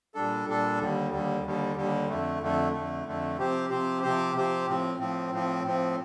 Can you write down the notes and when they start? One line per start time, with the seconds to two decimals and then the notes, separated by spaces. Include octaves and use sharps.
0.15 A#2 G3 D4 A4
0.47 A#2 G3 D4 A4
0.79 D#2 D3 G3
1.11 D#2 D3 G3
1.43 D#2 D3 G3
1.76 D#2 D3 G3
2.08 F2 D3 A3
2.40 F2 D3 A3
2.73 F2 D3 A3
3.05 F2 D3 A3
3.38 C3 F3 C4 G4 C5
3.70 C3 F3 C4 G4 C5
4.02 C3 F3 C4 G4 C5
4.35 C3 F3 C4 G4 C5
4.67 A2 F3 C4
4.99 A2 F3 C4
5.31 A2 F3 C4
5.63 A2 F3 C4